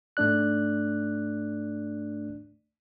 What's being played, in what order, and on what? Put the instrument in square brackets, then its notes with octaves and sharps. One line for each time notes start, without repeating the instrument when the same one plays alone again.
[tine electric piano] G#2 A3 D4 D5 F#6